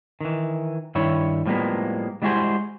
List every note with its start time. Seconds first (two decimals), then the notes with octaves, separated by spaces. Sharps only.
0.21 D#3 E3
0.95 G2 D#3 E4 C#5
1.46 A2 F3 G3 G#3 A#3 B3
2.22 G3 G#3 E4 F#4 G#4 C5